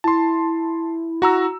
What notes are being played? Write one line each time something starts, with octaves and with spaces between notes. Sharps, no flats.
E4 A5 C6
F#4 A#5 E6